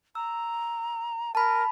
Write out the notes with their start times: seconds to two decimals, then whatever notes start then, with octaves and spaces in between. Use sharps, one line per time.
0.15 A#5 E6
1.35 A#4 A5 B5